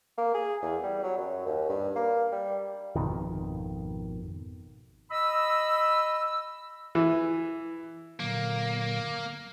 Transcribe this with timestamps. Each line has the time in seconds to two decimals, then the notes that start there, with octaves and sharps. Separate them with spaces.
0.18 A#3
0.34 G#4
0.62 E2
0.83 G3
1.03 F#3
1.17 F#2
1.46 D#2
1.69 G2
1.96 A#3
2.32 G3
2.96 G#1 F2 B2 D#3
5.11 D#5 B5 E6
6.95 E3
8.20 A#2 D3 F#3 A#3